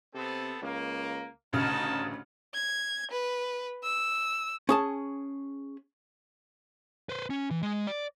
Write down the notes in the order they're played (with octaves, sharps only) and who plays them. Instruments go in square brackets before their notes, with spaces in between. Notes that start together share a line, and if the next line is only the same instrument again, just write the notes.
[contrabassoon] C3 [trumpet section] B3 C4 A4
[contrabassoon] C#2 [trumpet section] A#3
[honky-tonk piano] A1 C#3 F6 [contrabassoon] D2 [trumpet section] D#4 F#4 A5
[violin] G#6
B4
E6
[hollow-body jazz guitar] C#4 G#4 A5
[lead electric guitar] B4 C5
C#4
E3
G#3
D5